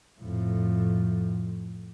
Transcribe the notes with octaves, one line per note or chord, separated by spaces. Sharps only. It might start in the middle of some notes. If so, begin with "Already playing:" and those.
F2 A2